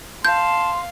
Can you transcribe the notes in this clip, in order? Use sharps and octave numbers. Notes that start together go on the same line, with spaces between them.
F5 A5 C6 G6